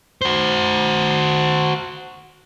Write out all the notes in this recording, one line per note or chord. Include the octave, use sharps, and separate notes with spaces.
F#4 C5